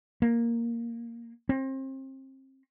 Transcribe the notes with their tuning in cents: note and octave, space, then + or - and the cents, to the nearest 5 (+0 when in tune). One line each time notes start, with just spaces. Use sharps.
A#3 +0
C4 +30